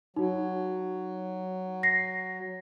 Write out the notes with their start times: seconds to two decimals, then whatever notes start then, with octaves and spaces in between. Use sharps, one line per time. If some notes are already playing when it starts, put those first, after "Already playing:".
0.16 F#3 D#4 F#4
1.83 A#6 C7